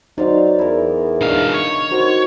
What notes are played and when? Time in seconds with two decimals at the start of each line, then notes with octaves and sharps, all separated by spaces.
0.18 F#3 D#4 C5 D5 F5
0.59 E2 E4 A#4
1.21 B2 D4 D#4 F5
1.54 C#5
1.91 D#4 F#4 A#4 C5 A#5